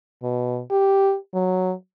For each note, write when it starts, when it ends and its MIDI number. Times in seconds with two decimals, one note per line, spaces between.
0.23 0.62 47
0.71 1.16 67
1.34 1.73 54